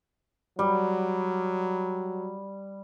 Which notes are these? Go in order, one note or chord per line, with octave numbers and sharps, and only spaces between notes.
F#3 G3